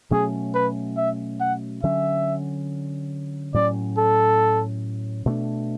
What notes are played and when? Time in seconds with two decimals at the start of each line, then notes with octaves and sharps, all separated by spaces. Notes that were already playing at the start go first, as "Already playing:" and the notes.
0.11 B2 F#3 A3 C#4 G#4
0.54 B4
0.97 E5
1.40 F#5
1.83 D3 F#3 C#4 E5
3.54 A2 F#3 C#4 D5
3.98 A4
5.26 B2 A3 D4